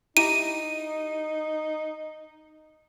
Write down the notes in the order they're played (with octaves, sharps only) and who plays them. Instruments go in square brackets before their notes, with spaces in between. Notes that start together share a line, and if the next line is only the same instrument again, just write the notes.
[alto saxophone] D#4 [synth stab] E4 G4 A#5 [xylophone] D#7